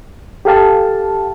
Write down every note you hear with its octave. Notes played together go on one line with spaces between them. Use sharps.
G4 A4 F5 A5